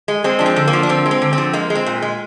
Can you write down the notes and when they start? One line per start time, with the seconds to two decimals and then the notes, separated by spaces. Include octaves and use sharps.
0.08 G#3
0.24 G#3 C4
0.39 F3 D4
0.46 C4
0.56 D3
0.68 A#3
0.73 F3
0.83 D4
0.89 D3 C4
1.06 G#3
1.11 C4
1.22 D3
1.33 C4
1.38 F3
1.53 G#3 A#3
1.70 G#3
1.75 C4
1.86 A#2
2.02 G#3